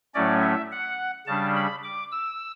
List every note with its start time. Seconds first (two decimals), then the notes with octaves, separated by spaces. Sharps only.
0.14 A2 F#3 A3 C#4 D5
0.42 E5
0.72 F#5
1.27 C#3 G3 D4 A5
1.55 B5
1.83 D6
2.12 E6